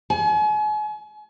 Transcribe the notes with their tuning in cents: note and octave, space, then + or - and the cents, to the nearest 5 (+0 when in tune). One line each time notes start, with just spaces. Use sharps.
G#5 +40